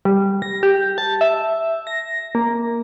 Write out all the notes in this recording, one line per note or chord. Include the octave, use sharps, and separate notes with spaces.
G3
A#6
G4
A5
E5
A#6
A#3